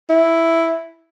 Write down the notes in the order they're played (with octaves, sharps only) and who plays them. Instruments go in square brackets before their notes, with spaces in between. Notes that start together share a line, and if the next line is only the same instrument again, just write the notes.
[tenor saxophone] E4